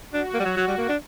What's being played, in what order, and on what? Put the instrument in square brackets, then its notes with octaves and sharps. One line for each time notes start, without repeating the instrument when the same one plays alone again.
[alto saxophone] D4 [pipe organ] F#4
[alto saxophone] A#3
G3
F#3
F#3
G3
A#3
D4